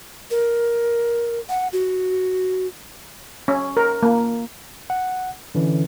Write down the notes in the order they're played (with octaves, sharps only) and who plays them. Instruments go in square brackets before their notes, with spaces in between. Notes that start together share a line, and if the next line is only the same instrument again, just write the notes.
[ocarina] A#4
F#5
F#4
[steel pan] C#4
A#4
A#3
[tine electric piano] F#5
D3 E3 C#4